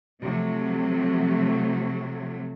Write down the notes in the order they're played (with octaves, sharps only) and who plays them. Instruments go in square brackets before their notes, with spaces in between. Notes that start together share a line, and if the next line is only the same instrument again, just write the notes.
[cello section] C3 F3 F#3 A3